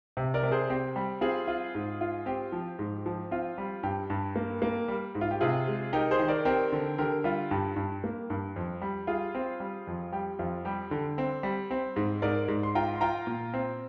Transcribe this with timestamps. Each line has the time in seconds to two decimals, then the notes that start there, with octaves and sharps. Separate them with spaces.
0.17 C3
0.34 A#4 D5
0.43 C3
0.51 G#4 C5
0.70 C4 G4
0.96 G3
1.21 C4 F4 G#4
1.47 F4
1.75 G#2
2.01 F4
2.26 C4 G4
2.52 F3
2.79 G#2
3.06 F3
3.31 C4 F4
3.58 G3
3.83 G2 G4
4.10 G2
4.36 A#3
4.62 A#3
4.88 G3
5.15 G#2
5.21 F4
5.31 G4
5.41 C3 F4 G#4
5.68 G#3
5.93 D#4 G4 A#4
6.11 G#4 C5
6.19 D#3
6.28 A#4 D5
6.45 C4 G4 A#4
6.72 D3
6.98 D3 G4 A#4
7.24 G3 F4
7.51 G2 G4
7.76 G2
8.04 A#3
8.30 G2
8.56 F2
8.82 G3
9.07 G3 F4 G#4
9.35 C4
9.60 G3
9.87 F2
10.12 G3 G4
10.39 F2 F4
10.65 G3 G4
10.91 D3
11.18 C4
11.43 G3
11.71 C4
11.96 G#2
12.22 G#2 A#4 D5
12.48 G#2
12.63 C6
12.75 F4 G5 A#5
12.95 C6
13.01 F4 G5 A#5
13.27 A#2
13.54 C4